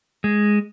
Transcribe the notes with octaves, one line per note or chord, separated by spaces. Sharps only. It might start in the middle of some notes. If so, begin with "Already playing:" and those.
G#3